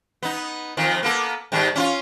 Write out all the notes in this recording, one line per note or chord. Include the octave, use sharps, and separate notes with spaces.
B3 D#4
F2 D#3 F3
A#3 B3 A4
G#2 D#3 G3
C#4 E4 F4